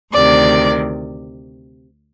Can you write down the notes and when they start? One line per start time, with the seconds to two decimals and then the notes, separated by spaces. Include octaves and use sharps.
0.13 D2 C3 D#3 D5